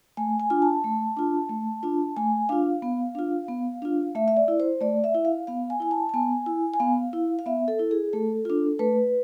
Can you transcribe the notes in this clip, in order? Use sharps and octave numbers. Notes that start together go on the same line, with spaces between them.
A3 G#5
G#5
D4 F4 G#5
A5
A3
D4 F4
A3
D4 F4
A3 G#5
D4 F4 F5
B3
D4 F4
B3
D4 F4
A3 E5
E5
D5
E4
C5
A3 D5
E5
E4
F5
B3 F5
G#5
E4 G#5
A5
A5
B3 G#5
E4
G#5
B3 F5
E4
F5
B3 E5
A4
E4
G#4
A3 A4
D4 F4
A3 B4